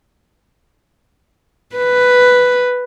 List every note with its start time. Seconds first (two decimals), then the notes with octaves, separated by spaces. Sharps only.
1.76 B4